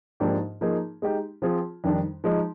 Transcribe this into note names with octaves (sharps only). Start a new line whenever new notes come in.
G#2 F3 A#3 D4 G4
F3 A#3 D#4 G#4
G#3 D#4 G4
F3 C4 F4 G#4
F2 D#3 G3 D4
F3 G#3 D#4